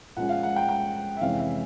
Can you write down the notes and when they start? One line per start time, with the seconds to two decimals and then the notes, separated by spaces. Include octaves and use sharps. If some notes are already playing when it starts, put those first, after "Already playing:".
0.17 A#2 F3 G#3 C#4 F#5
0.29 F5
0.43 F#5
0.56 G5
0.69 G5
1.17 E5
1.21 F2 C3 E3 G#3 C#4 F5
1.39 E5